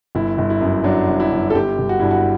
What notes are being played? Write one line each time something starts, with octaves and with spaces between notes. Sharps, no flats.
G1 E4
G1
E4
F#2
F#3 D4
G1
E4
G1
A4
G1 G4
G1
F#4
G2 E4
F#4